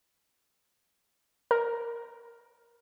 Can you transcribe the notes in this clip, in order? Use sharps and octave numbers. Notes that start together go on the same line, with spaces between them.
A#4